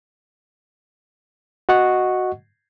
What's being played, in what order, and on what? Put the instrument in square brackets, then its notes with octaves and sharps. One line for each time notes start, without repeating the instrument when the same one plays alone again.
[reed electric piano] F#4 D#5 F#5 C#6